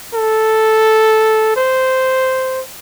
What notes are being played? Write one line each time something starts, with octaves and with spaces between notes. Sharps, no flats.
A4
C5